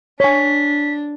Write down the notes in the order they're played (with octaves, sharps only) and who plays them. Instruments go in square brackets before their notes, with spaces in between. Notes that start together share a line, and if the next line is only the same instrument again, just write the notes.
[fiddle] D4 [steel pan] C#5 G#5 [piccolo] B6